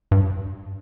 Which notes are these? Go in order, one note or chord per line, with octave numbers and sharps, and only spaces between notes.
G2